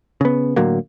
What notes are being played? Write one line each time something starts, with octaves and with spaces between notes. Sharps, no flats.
C#3 B3
A2 D3 F#3 A#3